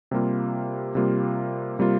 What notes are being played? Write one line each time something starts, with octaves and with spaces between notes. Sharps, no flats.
C3 G3 A#3 F4
C3 G3 A#3 F4
C3 G3 A#3 F4